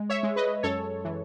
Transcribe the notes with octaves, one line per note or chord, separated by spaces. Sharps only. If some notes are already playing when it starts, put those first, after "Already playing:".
Already playing: G#3
C#5 E5
G#3
B4 D#5
F#2 A4 C#5
E3